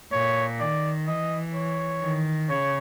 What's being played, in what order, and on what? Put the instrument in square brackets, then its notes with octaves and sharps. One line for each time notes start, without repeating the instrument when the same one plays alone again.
[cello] A#2 [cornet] C#5
[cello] D#3 [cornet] D5
[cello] E3 [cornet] D#5
[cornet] C#5
[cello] D#3
[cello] C#3 [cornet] C#5